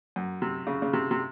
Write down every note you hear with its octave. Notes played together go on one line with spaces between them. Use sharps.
F#2
C3
C#3
C#3
C3
C3